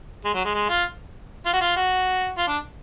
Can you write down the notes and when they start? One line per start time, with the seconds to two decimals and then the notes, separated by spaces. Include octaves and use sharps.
0.25 G#3
0.34 F#3
0.45 G#3
0.55 G#3
0.69 F4
1.46 F4
1.53 F#4
1.61 F4
1.76 F#4
2.38 F4
2.48 D4